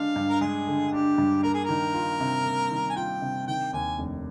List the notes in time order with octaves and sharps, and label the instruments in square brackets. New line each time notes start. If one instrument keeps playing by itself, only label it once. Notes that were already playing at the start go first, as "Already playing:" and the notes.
Already playing: [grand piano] D3 G#3 D4 [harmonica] F5
[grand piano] G2
[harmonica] A#4
[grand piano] G#3 [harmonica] G#4
[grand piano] D3
[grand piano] D4 [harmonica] G4
[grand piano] G2
[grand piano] A#3 [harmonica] A#4
[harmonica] G#4
[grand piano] D#3 [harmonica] A#4
[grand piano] F4
C3
A#3
D#3
[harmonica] G#5
[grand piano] F4 [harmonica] G5
[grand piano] C3
[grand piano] D#3 [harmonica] G5
[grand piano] D#2 [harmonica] G#5
[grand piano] F1